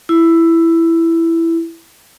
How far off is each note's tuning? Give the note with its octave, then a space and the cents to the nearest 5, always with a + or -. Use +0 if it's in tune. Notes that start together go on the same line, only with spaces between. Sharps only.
E4 +10